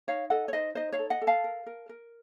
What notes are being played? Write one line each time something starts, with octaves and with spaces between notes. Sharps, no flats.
D#4 C#5 F5
A4 D#5 F#5
C#5
D#4 C5 D#5
D#4 C5 D#5
C#5 F5
A4
D#5 F#5
A4
F5 A5
A#4
A#4
A#4